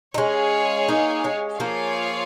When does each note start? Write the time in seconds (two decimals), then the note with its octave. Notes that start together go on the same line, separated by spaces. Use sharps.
0.14 D#4
0.18 G#3 C#4 G#4 C#5 F5 G#5
0.88 A#3 D#4
1.24 G#3 C#4
1.59 F3 A#3 F4 G#4 C#5 F5